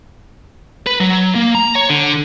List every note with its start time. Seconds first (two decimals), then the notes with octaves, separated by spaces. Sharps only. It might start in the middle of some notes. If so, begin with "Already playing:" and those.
0.86 B4
1.01 F#3
1.35 A#3
1.55 A#5
1.75 C#5
1.90 D3